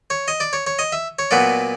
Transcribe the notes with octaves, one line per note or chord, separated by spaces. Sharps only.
C#5
D#5
D5
C#5
C#5
D#5
E5
C#5
A#2 F#3 B3 D5